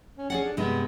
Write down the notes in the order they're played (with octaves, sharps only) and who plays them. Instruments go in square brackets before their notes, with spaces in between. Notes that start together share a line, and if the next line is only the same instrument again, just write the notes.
[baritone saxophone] C#4
[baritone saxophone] C#4 [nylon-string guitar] G#4 D5 F#5
[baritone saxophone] D4
[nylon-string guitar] G2 C3 G#3 [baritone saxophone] B3